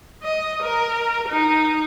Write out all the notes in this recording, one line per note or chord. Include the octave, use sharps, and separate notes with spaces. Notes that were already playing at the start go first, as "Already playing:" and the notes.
D#5
A#4
D#4